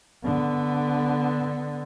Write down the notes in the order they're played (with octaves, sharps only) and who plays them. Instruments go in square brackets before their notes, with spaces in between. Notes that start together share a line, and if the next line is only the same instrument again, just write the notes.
[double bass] D3 B3